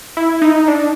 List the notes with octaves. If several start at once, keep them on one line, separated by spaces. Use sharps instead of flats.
E4
D#4
D4